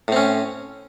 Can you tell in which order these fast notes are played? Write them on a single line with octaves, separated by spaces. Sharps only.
A2 C4 C#4